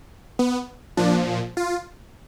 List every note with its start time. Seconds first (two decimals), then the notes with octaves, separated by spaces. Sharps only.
0.39 B3
0.97 A#2 F3 D4
1.57 F4